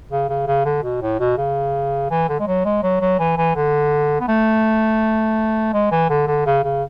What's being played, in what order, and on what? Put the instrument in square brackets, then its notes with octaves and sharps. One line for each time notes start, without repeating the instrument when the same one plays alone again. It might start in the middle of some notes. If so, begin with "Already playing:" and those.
[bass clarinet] C#3
C#3
C#3
D3
B2
A2
B2
C#3
E3
D3
G#3
F#3
G#3
F#3
F#3
E3
E3
D3
B3
A3
G#3
E3
D3
D3
C#3
C#3